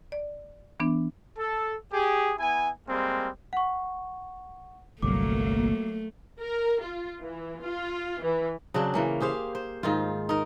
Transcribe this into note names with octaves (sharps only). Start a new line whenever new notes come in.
D5
E3 B3 D4
A4
G4 G#4
B3 E4 G#5
G3 G#3 A#3 C4
F#5 C#6
G1 C2 F#3 A3 A#3 D6
A#4
F4
E3
F4
E3
C#3 F#3 C4 D4
E3 A#3 C#4
G4 G#4 C5 F5
C5
G#2 D#3 F4
D#4 A#4